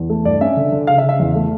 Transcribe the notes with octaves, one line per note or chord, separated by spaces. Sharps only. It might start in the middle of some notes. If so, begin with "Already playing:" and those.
Already playing: E2
A3
G2 D5
C#4 E5
D3
D3
C#3 F5
E5
C#3
E5
E2
A3